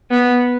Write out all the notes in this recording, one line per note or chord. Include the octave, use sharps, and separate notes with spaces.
B3